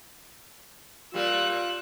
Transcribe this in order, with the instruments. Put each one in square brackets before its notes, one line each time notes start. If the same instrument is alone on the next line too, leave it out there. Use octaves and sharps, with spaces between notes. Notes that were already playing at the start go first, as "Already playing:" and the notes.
[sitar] A#2 G3 A#3 [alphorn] F4 [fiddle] E6 F#6